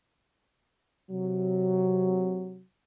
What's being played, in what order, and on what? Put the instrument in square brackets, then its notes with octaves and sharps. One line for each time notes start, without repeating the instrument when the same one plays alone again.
[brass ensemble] C3 F#3